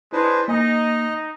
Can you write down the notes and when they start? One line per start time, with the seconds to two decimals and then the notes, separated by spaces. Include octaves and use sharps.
0.13 G#3 D4 E4 B4 C5
0.48 A#3 D#4 D#5 G#5